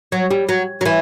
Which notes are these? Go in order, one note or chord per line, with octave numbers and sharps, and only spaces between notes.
F#3
G3
F#3
F#3
E3